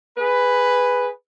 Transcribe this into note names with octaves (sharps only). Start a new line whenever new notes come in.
G#4 B4